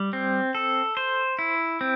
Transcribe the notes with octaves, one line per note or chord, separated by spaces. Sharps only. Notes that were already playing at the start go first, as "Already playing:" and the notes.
Already playing: G3
C4
A4
C5
E4
C4